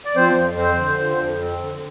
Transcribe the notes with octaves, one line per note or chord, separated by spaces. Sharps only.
D5
F3 C4 C5
F2
C4 C5
D3
F3
F2
C4
D3